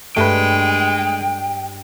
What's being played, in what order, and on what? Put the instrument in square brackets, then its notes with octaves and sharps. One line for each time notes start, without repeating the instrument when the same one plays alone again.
[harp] G2 [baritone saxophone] G#3 [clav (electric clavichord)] A3 B4 [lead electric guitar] G5